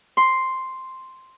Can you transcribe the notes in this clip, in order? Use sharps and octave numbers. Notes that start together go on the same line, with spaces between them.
C6